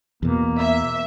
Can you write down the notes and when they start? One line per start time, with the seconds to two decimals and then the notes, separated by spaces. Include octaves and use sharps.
0.23 E2 B2 A#3
0.60 E5